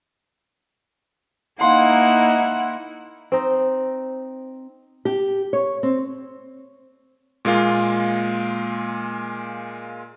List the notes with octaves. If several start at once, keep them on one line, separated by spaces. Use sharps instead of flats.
A#3 D#4 E4 F5 F#5 C6
C4 D#4
G4
C#5
C4
A#2 G#3 A#3 F4